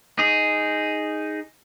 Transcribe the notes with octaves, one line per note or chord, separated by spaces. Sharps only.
D#4 G#4